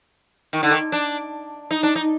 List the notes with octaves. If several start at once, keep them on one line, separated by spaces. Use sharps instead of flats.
D#3
D3
D#3
D4
D#4
D4
D#4